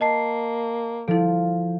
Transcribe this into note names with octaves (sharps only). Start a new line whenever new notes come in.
A#3 D#5 A5 C7
F3 E4 A4